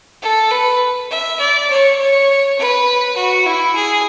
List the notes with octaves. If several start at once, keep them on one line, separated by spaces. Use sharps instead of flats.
A4
B4
E5
D5
C#5
C#5
B4
F#4
E4
G#4